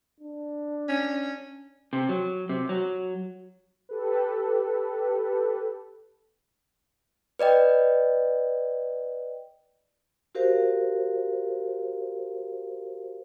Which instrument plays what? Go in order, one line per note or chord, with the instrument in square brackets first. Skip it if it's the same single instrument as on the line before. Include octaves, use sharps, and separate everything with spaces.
[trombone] D4
[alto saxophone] C#4
[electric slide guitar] C3
F#3
C3
F#3
[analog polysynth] G4 A4 B4
[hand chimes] B4 D5 D#5 G5
[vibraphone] F#4 G4 A#4 C5 F5